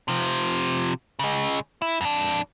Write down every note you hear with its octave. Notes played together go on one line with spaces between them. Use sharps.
C3 F3
C#3 G#3
E4
F2 D4